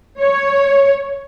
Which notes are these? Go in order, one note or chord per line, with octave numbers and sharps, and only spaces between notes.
C#5